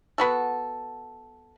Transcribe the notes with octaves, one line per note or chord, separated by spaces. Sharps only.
B3 F#4 A4